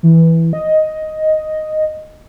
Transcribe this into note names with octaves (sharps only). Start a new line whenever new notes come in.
E3
D#5